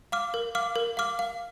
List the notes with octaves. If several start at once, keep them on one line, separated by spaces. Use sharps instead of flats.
F5 D6 F6
A#4
F5 D6 F6
A#4
F5 D6 F6
F5